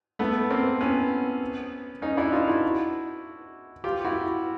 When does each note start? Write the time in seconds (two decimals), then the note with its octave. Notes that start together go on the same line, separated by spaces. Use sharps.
0.19 A3 B3
0.50 A#3 C4
0.81 B3 C#4
2.02 C#4 D#4
2.17 D4 E4
2.32 D#4 F4
2.48 E4 F#4
3.84 F4 G4
4.04 E4 F#4